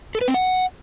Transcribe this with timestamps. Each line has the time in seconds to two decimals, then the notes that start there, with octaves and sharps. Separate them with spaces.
0.15 A4
0.21 B4
0.28 C4
0.34 F#5